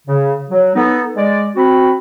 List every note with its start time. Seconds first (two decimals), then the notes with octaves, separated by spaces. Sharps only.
0.07 C#3
0.50 F#3
0.76 B3 D#4 A4
1.16 G#3 D5
1.56 C4 F#4 B5